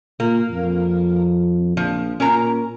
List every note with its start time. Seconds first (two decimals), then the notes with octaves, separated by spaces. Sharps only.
0.20 A#2 A#3
0.52 F2
1.77 A#1 F3
2.20 A#2 C#4 A#4 A#5